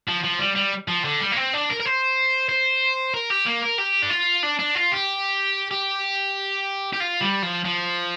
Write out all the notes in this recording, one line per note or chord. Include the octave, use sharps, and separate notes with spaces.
F3
F3
G3
G3
F3
D3
G3
A#3
C4
D4
A#4
A#4
C5
C5
A#4
G4
A#3
A#4
G4
D4
F4
D4
D4
F4
G4
G4
G4
F4
G3
F3
F3